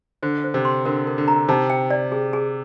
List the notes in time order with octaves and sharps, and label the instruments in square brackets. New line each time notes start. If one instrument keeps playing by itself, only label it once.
[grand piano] D3 [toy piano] C5
[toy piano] C5
[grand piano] C3
[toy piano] C6
[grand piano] D3 [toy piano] A#4
[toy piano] A#4
[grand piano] D3
[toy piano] A#5
[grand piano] C3 [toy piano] D#4
[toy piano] G5
D5
G#4
G#4